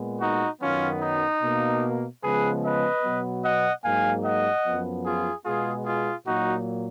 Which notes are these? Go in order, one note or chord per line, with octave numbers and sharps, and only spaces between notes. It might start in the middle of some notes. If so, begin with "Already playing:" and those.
Already playing: A#2 G#3 B3
D#4 F#4
F#2 D#3 F#3 B3 C#4 F4
D#4
B2 A#3
C#3 F3 G#3 B3 G#4 B4
B4 D#5
B2 F#3 B3
D#5 F#5
G#2 F#3 A#3 F5 G#5
D#5 F#5
F#2 F3 B3
F4 G#4
B2 G#3 B3 F4 G#4
F4 G#4
A#2 F#3 A#3 D#4 F#4